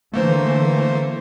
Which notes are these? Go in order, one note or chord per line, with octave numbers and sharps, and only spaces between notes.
D3 E3 A3 A#3 C5